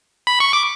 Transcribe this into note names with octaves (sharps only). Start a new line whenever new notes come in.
B5
C#6
D6